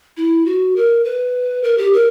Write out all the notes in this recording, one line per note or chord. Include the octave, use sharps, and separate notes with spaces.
E4
F#4
A#4
B4
A#4
G4
A#4